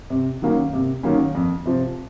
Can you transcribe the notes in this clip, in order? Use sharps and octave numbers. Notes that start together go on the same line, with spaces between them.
C3
D#3 F#3 A#3 C#4
C3
D#3 F#3 A#3 C#4
F2
C3 F3